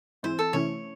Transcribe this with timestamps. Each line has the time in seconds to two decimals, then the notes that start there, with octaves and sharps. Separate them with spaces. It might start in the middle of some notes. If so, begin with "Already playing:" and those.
0.23 G#2 E3 C4 E4 C5
0.39 A4
0.53 C3 E3 A3 C#4 E4 C#5